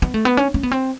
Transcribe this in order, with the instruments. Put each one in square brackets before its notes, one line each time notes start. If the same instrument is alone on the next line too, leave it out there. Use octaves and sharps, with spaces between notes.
[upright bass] B3
A3
B3
C#4
C#4
B3
C4